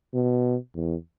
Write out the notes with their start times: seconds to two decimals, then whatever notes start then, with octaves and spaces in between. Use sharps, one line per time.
0.14 B2
0.74 E2